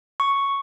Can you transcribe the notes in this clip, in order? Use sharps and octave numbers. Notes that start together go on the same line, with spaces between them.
C#6